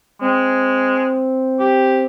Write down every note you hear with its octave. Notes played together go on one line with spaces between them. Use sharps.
G#3 C4
G4